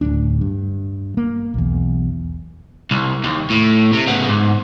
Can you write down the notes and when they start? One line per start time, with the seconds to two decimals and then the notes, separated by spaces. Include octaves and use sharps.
0.01 D1 G1 D2 D4
0.41 G2
1.17 A#3
1.54 B1 E2
2.91 C2
3.24 D#2
3.50 A2
3.93 C3
4.07 C#3 B3
4.29 G#2